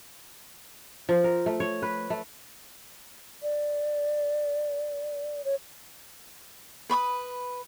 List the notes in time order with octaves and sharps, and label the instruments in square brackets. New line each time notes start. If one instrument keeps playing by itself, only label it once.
[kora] F3
A#4
A3
C#5
B4
A3
[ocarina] D5
C#5
[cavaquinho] B4 B5 C#6 D#6